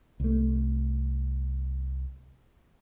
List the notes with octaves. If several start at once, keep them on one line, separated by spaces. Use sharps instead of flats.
C2 A3